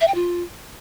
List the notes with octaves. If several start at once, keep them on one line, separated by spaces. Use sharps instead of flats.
E5
G5
F4